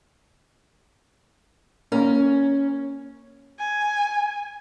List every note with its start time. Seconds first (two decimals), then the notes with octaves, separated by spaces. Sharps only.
1.92 A#3 C#4 A#4
3.60 G#5